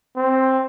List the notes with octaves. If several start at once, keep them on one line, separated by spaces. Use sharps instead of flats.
C4